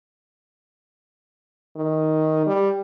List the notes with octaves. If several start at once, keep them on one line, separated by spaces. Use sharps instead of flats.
D#3
G3